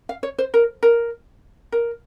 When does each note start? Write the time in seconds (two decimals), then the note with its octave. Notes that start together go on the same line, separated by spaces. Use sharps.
0.09 F5
0.23 C#5
0.38 C5
0.54 A#4
0.83 A#4
1.72 A#4